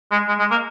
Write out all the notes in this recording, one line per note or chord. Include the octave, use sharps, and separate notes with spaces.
G#3
G#3
G#3
A#3